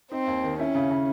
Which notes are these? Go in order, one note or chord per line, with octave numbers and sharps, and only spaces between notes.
C4 D#4
D#2
D#3
C#4 E4
C#3
C#3